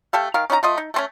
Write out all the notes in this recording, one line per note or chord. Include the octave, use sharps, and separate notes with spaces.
A3 G4 A4 F5
D#3 A#4 F5
C#4 D#4 B4 A#5
A3 F4 D#5
D#4
A3 C4 C#4